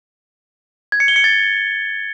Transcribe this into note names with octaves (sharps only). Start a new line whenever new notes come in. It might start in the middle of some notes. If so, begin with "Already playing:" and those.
G#6
C#7
G7
C#7
A6